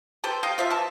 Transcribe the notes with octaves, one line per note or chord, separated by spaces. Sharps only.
G4 A4 B4 C5
D#5 F5 G5
F4 C5 E5 F5
E3 A5